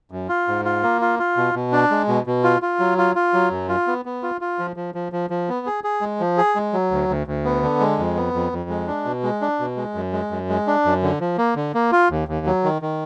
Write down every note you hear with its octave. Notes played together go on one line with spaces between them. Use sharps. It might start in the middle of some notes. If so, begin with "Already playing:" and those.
F#2
F4
G#2
F4
A#3
F4
F4
B2
B2
D4
G#3
B2
B2
F4
F4
F#3
F4
F4
F#3
F#2
F4
B3
B3
F4
F4
F3
F3
F3
F3
F3
B3
G#4
G#4
G#3
F3
G#4
G#3
F#3
D2
D2
D2
B3
D3
G#3
F2
B3
F2
F2
G#3
D4
B2
G#3
D4
B2
G#3
F#2
G#3
F#2
G#3
D4
F#2
D3
F3
A#3
D3
A#3
F4
D#2
D#2
F#3
D#3
D#3